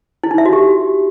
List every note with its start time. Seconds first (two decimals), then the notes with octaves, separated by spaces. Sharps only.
0.24 E4
0.31 D#4
0.38 E5
0.45 F#4
0.53 G4